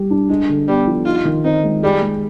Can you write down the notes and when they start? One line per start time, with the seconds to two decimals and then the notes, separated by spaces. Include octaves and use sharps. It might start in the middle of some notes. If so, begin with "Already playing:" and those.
Already playing: G3 G4
0.10 D4
0.29 G#3 D4
0.49 D3
0.67 G3 B3
0.87 F3
1.06 D#4 F4
1.25 D#3
1.44 C4 D#4
1.64 G#3
1.83 G3 G#4
2.02 G#3